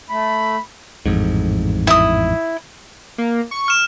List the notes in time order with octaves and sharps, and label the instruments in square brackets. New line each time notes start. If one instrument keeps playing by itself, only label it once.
[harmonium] A3 [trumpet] B5
[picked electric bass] A1 F2 G#2
[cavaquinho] E4 D#6
[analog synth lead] A#3
C#6
[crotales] F6 E7